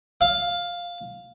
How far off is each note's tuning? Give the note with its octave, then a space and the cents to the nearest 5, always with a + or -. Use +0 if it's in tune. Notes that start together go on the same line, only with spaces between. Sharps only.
F5 +5